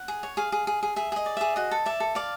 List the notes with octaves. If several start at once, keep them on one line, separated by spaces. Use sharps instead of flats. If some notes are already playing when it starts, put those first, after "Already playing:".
Already playing: F#5
G#4
C#5
G#4 F5
G#4
G#4
G#4
G#4 E5
G#4 D#5
D5
G#4 E5
F#4 D#5
A4
D5 E5
A4
D5 F5